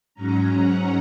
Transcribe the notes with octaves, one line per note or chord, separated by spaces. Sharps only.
G#2 F#3 C#4 A#5
F#5